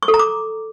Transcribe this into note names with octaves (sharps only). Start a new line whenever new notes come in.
C#6
A4
A#5
D6